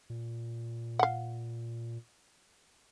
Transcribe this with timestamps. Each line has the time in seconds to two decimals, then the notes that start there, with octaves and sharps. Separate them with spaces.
0.10 A#2
0.99 F5 F#5